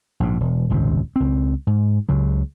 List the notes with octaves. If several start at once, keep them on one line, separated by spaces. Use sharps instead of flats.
A#1 G#2
E1
D#1 G#1 C#2 C3
C#2 C4
G#2
C#2 C#3 F#3